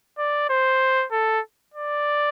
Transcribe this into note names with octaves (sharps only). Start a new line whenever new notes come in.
D5
C5
A4
D5